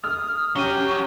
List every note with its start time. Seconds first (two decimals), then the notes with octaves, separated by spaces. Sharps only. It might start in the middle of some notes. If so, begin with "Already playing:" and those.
0.04 D#6 F6
0.56 F#3 C#4 G4 D#7